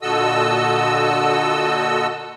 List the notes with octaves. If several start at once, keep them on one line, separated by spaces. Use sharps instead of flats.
A#2 D3 F#4 A4 D#5 E6